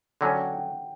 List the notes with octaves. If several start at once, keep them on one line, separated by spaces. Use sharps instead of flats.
D3 F#3 C#4 F#5
G5
F#5
G5